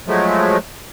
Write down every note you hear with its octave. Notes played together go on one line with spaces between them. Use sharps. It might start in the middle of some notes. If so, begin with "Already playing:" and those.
F3 F#3 G#3 A3